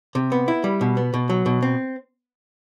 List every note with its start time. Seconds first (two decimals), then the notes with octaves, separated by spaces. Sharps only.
0.15 C3
0.32 B3
0.48 E4
0.64 G3
0.81 B2
0.97 B3
1.14 B2
1.29 F#3
1.46 B2
1.62 C4